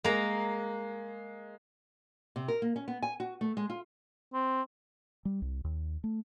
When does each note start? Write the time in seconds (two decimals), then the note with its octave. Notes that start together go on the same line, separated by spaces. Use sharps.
0.04 G#3 A#3 A#5
2.36 C3
2.48 A#4
2.62 A#3
2.76 C#4
2.88 B3
3.02 G#5
3.20 F#4
3.41 A3
3.57 G#3
3.70 F4
4.34 C4
5.25 G3
5.42 C2
5.64 D#2
6.04 A3